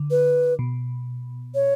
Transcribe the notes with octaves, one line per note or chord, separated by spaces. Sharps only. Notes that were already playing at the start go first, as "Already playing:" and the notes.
Already playing: D3
B4
B2
C#5